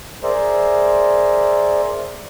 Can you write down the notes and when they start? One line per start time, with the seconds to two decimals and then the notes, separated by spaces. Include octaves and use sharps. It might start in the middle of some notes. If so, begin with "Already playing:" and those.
0.23 G#4 A#4 C5 D5 E5